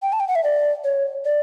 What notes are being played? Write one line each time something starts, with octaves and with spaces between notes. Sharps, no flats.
G5
A5
G5
F#5
E5
D5
C#5
D5